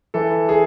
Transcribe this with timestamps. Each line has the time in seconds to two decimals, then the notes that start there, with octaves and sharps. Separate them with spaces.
0.14 E3 A4
0.49 G#4